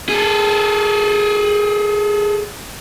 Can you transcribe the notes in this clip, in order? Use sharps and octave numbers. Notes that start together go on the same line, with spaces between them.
G#4 A4